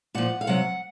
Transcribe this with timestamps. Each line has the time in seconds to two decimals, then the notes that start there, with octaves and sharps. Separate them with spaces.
0.15 A#2 F3 F#5
0.41 F5
0.47 C3 F#3 F#5